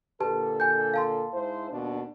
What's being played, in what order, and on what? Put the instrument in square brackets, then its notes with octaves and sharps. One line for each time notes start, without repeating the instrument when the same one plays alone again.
[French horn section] A#2 D3 A4 [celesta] G4 B4 A5
[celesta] G#5 G6
F5 A5 C6
[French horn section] G#2 E4 C5
D#2 B2 D4